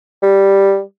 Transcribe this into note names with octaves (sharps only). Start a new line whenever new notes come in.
G3